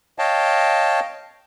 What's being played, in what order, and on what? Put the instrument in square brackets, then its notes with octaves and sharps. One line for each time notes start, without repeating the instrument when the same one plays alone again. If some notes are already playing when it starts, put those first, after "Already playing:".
[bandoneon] C#5 D#5 F5 G5 A5